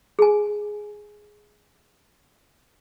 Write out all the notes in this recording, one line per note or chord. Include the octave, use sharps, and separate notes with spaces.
G#4 G#5